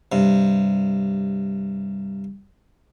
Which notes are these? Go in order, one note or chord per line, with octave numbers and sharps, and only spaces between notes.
G2 C3